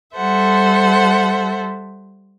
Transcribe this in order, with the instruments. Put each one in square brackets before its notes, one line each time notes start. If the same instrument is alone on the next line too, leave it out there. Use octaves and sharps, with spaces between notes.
[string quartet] G3 A4 C5 E5 F#5